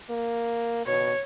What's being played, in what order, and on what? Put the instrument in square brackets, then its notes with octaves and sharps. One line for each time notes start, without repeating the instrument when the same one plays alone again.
[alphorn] A#3
[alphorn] B2 [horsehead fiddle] C#5